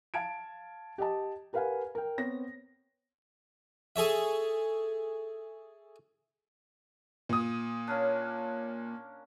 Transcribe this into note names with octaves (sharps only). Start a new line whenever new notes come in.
F5 A5 G#6 D7
G4 D#5 A5
G4 A#4 B4 F5 F#5 G#5
A#4 G5
B3 C4 C#5 A#6
G#4 A4 C#5 E5
A#2 D#6
A#3 C#4 D4